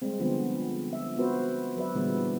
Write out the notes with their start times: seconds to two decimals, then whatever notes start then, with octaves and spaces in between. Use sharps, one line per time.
0.02 G3 G#3 C4
0.19 D3 F3 G#3 B3 C4
0.93 E5
1.17 B3 C4 F#4 B4 C5
1.77 F#3 B4 D5 E5
1.95 A#2 D3 E3 G3 G#3 B3